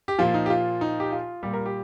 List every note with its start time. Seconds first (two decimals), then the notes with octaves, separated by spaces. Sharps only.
0.08 G4
0.19 A#2 F3 F4
0.34 D#4
0.46 G4
0.50 F4
0.81 D#4
1.00 G4
1.12 F4
1.43 A#2 G3 G4
1.54 A#4
1.66 G4